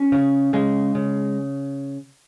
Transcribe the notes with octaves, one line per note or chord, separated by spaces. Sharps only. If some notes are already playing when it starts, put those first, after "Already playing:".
Already playing: C#4
C#3
C#3 G#3
C#3